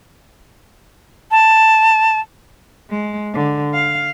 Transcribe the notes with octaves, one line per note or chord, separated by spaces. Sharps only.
A5
G#3
D3
F5